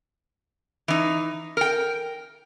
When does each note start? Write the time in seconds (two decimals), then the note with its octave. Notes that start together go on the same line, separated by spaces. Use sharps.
0.88 E3 D#4
1.57 A#4 G5